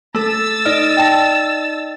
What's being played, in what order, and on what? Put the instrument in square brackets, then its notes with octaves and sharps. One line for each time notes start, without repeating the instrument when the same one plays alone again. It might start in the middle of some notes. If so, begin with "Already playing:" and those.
[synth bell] A3 A4 [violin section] E6 A6
[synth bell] D#4 D5 D#5 [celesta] F6
[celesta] G5 A5 A#6